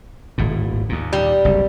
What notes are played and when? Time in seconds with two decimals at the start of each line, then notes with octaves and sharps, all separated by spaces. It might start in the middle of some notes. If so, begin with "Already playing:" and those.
0.38 D#1 G#1 A2
0.89 D#2 A#2
1.13 G3
1.45 F#1 C2